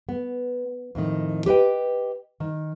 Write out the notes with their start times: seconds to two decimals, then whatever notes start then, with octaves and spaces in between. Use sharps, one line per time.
0.09 B3
0.95 F2 A2 D#3
1.46 G4 B4 D#5 G5
2.40 D#3